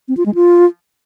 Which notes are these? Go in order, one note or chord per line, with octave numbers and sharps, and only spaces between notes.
C4
F4
G#3
F4